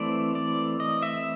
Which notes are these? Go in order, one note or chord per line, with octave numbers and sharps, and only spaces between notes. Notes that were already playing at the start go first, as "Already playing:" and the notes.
Already playing: E3 A3 C4 D5
D5
D#5
E5